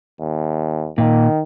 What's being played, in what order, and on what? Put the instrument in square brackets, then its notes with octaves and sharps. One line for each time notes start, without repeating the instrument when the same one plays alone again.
[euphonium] D#2
[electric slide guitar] A#2 [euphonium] D#3